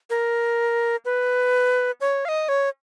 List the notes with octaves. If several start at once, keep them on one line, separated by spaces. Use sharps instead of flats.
A#4
B4
C#5
F5
D#5
C#5